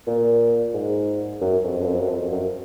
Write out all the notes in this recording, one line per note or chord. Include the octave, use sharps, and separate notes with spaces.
A#2
G#2
F#2
F2
F#2
F2
F#2
F2
F#2